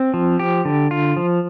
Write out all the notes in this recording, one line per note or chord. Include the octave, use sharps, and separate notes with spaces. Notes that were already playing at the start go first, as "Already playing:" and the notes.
Already playing: C4
F3
G4
D3
F4
F3